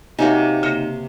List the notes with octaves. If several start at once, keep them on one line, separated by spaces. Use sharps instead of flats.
C3 A#3 D#4 F#4 C#5 E5 G#5
C#3 A#3 C5 A#6